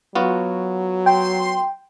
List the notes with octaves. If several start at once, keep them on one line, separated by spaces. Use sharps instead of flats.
F#3 B3 F4 F#4
G5 C6